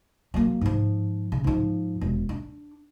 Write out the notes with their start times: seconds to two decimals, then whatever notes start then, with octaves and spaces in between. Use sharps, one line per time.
0.34 F#3 A#3
0.61 G#2 F3
1.32 C#3
1.44 G#2 F3
2.01 E1
2.29 D4